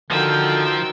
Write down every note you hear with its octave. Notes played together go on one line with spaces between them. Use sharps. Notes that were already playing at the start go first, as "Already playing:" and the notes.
D3 D#3 F3 F#4 G5 E6